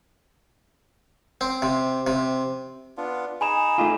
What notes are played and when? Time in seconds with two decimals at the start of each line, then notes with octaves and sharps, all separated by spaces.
1.41 C4
1.62 C3
2.07 C3
2.97 B3 D4 F4
3.41 D#4 G#4 G#5 B5 E7
3.78 A3 D#4 F4 G4